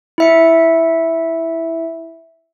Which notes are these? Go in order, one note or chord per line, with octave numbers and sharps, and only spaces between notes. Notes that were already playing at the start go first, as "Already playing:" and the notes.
E4 E5 C#7